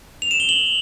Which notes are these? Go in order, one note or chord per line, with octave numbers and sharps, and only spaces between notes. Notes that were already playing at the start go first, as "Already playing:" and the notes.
F7
E7
G7
F#7